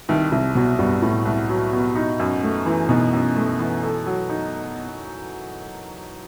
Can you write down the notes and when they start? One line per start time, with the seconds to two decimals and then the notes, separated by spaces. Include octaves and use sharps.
0.09 C2 D#3
0.32 C2 C3
0.55 B2 F#3
0.79 G2 B2
1.02 C2 A2
1.25 C2
1.49 F#3
1.73 B2
1.95 D#4
2.20 F#2
2.43 A3
2.66 E3
2.89 B2 D#4
3.13 F#2
3.36 A3
3.59 E3
3.83 A4
4.06 F#3
4.29 D#4